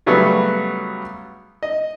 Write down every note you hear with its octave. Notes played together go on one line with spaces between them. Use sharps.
C#3 F#3 G3 A3 B3
D#5